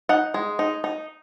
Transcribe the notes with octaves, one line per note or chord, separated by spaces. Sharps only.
D#4 F#5
G#3
D#4
D#4